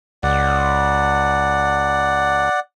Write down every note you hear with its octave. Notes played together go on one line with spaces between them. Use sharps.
C#2 D5 F#5